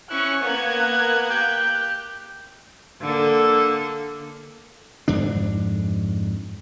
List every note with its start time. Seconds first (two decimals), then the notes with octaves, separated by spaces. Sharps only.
0.10 C#4 E4 C#6 F#6
0.42 A#3 B3 G#6
1.30 G4 G6
3.01 D3 A#3 A4
5.08 F2 G#2 D4